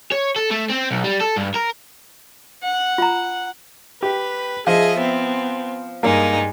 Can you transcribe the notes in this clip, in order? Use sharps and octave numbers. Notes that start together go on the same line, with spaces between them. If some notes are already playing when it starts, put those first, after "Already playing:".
C#5
A4
A3
C4
B1
G3
A4
G2
A#4
F#5
F4 A#5
G4 B4
F3 G#4 D#5 E5
B3 C4
G2 G#3 A#3 D#4